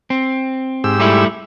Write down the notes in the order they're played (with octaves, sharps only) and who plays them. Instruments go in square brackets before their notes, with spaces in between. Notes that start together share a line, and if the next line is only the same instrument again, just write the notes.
[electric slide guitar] C4
[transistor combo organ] G#2 G4 E6
[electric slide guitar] G3 A3 E4